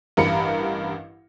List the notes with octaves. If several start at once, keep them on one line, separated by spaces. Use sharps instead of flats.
A1 G2 A#4 B5 C#7